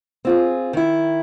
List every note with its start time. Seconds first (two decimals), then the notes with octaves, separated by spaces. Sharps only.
0.25 C4 F4 G#4
0.73 D#3 E4